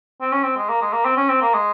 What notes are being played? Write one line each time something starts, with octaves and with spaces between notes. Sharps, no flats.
C4
C#4
C4
G#3
A#3
G#3
A#3
C4
C#4
C4
A#3
G#3